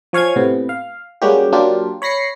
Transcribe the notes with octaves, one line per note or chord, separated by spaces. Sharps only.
F3 C#5 F5 G#5 G#6
A2 C3 B3
F5
G3 G#3 A#3 C#4 F#4 G4
F#3 A#3 D4 F4 G4
C#5 B5 A#6 C7 C#7